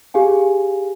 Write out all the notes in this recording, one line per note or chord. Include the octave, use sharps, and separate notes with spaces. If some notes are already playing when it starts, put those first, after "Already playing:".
G4 G#4 F5 G#5